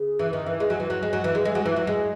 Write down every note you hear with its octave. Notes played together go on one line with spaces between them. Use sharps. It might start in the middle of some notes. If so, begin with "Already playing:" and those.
Already playing: C#3
E3
D#3
E3
G#3
F#3
E3
F#3
G#3
F#3
E3
G#3
G#3
F#3
E3
F#3
G#3